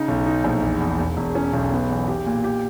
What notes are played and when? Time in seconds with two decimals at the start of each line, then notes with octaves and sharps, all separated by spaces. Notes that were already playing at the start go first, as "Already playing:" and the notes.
Already playing: C#3 D#4
0.08 B1
0.26 D#4
0.44 A#1
0.62 E2
0.80 E2
0.99 E1
1.17 E1
1.35 C#4
1.53 B1
1.72 B3
1.90 E2
2.08 G4
2.26 A#2
2.44 G4